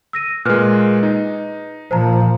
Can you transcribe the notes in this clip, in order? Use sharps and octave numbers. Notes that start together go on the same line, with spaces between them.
E6 A#6 D#7
A#2 G#3 B4 F6 F#6
D#4
A#2 F3 C5 A5 A#5